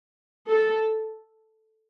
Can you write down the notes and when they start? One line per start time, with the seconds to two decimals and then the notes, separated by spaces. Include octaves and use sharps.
0.49 A4